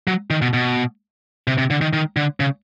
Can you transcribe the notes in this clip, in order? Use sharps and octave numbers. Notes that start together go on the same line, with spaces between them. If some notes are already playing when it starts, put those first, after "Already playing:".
F#3
D#3
B2
B2
C3
C3
D3
D#3
D#3
D3
C#3